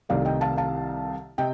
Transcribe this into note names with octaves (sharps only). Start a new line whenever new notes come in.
C2 C3 D#3 A3 D5 F5
D#5 G5
F5 A5
F5 A5
C3 D#5 G5